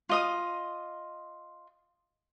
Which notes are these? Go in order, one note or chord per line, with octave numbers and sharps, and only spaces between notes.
F4 D#5 D#6